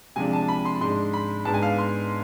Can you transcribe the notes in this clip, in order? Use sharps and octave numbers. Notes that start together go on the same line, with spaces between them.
C3 F3 G#3 D4 G#5
A5
B5
C6
G#2 G#3 D4 C6
B5
G#2 G#3 B3 D4 A5
G#5
F5
C6